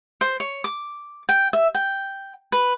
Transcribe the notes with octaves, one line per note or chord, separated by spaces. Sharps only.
C5
C#5
D6
G5
E5
G5
B4